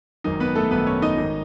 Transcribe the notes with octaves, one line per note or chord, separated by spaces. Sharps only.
G#1 F#2 D#3 D#4
B3 B4
A3 A4
G#1 F#2 D#3 B3 B4
C#4 C#5
D#4 D#5
G#1 D#3